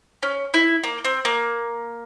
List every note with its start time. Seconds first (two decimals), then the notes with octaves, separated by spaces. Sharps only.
0.23 C#4
0.54 E4
0.84 A#3
1.05 C4
1.25 A#3